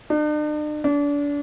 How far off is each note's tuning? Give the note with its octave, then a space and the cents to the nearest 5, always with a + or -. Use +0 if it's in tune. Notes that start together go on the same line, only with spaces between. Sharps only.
D4 +45
D4 -30